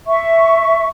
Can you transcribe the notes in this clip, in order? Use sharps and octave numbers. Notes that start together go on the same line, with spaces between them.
E5 C#6